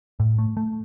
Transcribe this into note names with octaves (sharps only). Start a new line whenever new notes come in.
A2
A3
A3